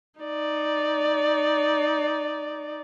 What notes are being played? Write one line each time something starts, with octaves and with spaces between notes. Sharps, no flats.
D#4 D5